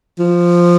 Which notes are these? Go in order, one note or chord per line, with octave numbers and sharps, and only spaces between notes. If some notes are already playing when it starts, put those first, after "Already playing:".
F3